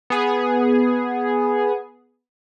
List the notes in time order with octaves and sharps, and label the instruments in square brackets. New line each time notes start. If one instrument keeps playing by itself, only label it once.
[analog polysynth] B3 G#4